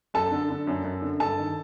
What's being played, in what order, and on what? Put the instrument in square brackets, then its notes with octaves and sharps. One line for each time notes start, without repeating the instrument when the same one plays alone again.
[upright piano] F#2 A4 A5
D3
D3
F#2
F#2
D3
G2 A4 A5
D#3